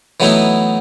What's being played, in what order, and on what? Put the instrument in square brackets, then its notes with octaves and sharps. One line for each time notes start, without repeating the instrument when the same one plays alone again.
[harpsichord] E3 F#3 A3 B3 D#4 E4